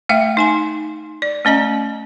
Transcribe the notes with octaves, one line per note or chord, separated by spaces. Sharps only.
A3 E5 F5 G5
D#4 G#5 C6
D5
A3 C#4 D#5 A#5